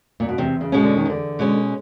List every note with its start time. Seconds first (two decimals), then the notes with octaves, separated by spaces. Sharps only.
0.20 A#2
0.29 B2
0.38 E2 C3
0.61 C#3
0.72 B2 G#3 C#4
0.83 D3
0.97 D#3
1.05 E2 D3
1.39 B2 G#3 C#4